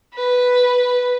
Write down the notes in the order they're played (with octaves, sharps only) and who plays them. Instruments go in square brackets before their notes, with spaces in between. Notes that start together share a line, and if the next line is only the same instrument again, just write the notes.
[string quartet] B4